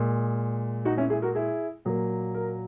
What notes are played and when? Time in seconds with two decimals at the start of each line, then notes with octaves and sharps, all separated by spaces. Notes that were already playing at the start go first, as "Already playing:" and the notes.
Already playing: A#2 G#3
0.85 D#4 F#4
0.97 C#4 E4
1.10 E4 G#4
1.22 F#4 A#4
1.35 E4 G#4
1.85 A#2 F#3 A#3
2.34 A#4